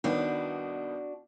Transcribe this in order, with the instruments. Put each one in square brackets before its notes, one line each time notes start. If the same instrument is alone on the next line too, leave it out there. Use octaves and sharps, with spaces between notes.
[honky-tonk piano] C2 D#3 B3 [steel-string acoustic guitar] D4 F#4